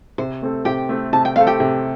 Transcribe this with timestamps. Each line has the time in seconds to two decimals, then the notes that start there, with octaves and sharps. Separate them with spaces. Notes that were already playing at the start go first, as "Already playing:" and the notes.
0.18 C3 C5
0.42 A3 C4 A4
0.65 C3 G4 G5
0.89 A3 C4 A4
1.13 C3 A5
1.25 G5
1.36 A3 C4 A4 F5
1.47 G4 G5
1.60 C3